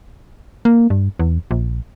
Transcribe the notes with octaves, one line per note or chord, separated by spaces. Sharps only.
A#3
G2
E2
A#1